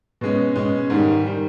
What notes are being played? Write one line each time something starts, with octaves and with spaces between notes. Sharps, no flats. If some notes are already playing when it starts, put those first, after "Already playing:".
B2 G#3 C#4
B2 G#3 C#4
G#2 D#3 G3
D#3 G3